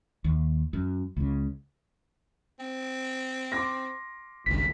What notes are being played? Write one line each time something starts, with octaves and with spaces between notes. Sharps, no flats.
D#2
F#2
C#2 C#3
C4
C6 D6 A#6
G#1 C#2 G2 B6